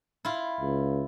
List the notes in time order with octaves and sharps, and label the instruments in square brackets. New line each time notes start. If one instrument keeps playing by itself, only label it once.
[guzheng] E4 F4
[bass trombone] C#2